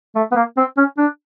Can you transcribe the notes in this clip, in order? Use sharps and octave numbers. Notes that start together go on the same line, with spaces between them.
A3
B3
A#3
C4
C#4
D4